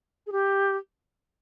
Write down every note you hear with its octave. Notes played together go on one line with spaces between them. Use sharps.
G#4
G4